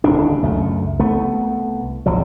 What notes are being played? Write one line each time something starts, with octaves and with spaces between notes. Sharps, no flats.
D#1 C#2 D3 D4
C#2 F#2 A3
C2 A3 B3
G#1 C#2 F3 F#3